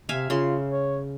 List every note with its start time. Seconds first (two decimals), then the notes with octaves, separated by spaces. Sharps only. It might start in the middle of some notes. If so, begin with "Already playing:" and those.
0.09 C3 E5 F5 G#5
0.30 C#3 F4 C6
0.70 C#5